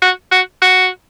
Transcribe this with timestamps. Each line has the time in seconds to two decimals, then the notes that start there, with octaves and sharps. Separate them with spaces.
0.02 F#4
0.32 F#4
0.62 F#4